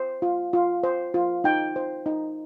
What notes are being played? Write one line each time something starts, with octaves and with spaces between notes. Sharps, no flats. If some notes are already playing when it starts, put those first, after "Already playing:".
Already playing: C5
F4
F4
C5
F4
D#4 G5
C5
D#4